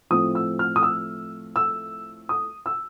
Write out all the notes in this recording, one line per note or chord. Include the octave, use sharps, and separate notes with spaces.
A2 F3 A3 C4 D#6
E6
F6
D#6
E6
E6
D#6
E6